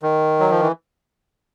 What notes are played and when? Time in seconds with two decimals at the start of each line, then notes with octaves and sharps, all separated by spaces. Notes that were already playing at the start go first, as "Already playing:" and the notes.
0.03 D#3
0.40 F#3
0.50 F3
0.61 E3